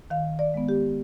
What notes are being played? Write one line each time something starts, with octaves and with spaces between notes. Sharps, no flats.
D#3 F5
D5
G#3 B3
G4